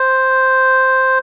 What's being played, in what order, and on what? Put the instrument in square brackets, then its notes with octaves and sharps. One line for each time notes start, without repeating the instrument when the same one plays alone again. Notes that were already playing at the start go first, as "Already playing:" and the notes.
Already playing: [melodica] C5